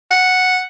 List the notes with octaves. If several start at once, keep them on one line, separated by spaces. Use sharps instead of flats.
F#5